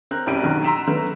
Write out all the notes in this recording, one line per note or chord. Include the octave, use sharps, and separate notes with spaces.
C4 A#4 F#6
E1 F#2 E4 G4 D7 D#7
B1 F#2 D3 D#3 F#3
A#5 C6 E6 B6 E7
F#3 A3 B3 B4